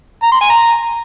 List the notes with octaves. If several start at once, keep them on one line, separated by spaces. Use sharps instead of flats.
A#5
C6
G#5
A#5